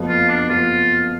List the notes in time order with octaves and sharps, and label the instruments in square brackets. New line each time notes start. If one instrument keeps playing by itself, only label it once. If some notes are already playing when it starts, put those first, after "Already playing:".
Already playing: [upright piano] F#1 F2 F3 B3 F#4
[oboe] F4
D4
[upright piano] F#1 F2 F3 B3 F#4 [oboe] F4